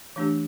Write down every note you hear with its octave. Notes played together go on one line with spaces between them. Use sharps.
E3 A3 D4 G4